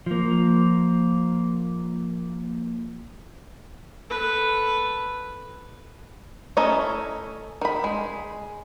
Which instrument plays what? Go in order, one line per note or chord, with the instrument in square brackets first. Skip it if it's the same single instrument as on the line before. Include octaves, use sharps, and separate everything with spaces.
[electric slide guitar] F3 A#3
[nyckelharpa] A4 B4
[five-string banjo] A3 C#4 E4 D#5 A#5
D#3 B5
G#3